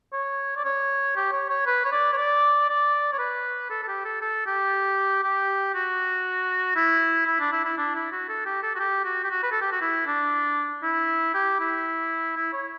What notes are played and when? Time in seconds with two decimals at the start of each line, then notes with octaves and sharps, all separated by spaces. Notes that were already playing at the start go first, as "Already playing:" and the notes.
0.13 C#5
0.57 D5
0.65 C#5
1.16 G4
1.33 C#5
1.50 C#5
1.67 B4
1.85 C#5
1.92 D5
2.13 C#5
2.18 D5
2.69 D5
3.13 C#5
3.19 B4
3.70 A4
3.83 A4
3.88 G4
4.05 A4
4.22 A4
4.46 G4
5.23 G4
5.75 F#4
6.76 E4
7.27 E4
7.40 D4
7.52 E4
7.65 E4
7.78 D4
7.96 E4
8.12 F#4
8.29 A4
8.45 G4
8.63 A4
8.75 F#4
8.79 G4
9.05 F#4
9.24 G4
9.31 F#4
9.43 B4
9.52 A4
9.62 G4
9.73 F#4
9.82 E4
10.07 D4
10.83 E4
11.34 G4
11.60 E4
12.37 E4
12.53 C#5